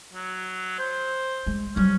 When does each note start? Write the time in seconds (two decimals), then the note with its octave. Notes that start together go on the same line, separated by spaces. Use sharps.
0.13 F#3
0.79 C5
1.47 G#3
1.76 F#3 G3 C#4